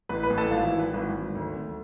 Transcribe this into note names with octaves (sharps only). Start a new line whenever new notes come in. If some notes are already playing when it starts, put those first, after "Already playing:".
A1 B4 B5
B4 B5
A1
A4 A5
G#1 F4 F5
E4 E5
E3
B4
G#1
G#1
D2
D2